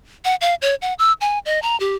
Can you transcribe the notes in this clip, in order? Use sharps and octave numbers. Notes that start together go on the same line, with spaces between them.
F#5
F5
C#5
F#5
E6
G#5
D#5
A#5
G4